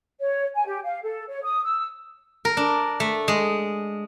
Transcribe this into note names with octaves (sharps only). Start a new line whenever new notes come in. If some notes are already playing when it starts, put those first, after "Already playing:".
C#5
G#5
G4
F5
A4
C#5
D#6
E6
A#4
D4
A3
G#3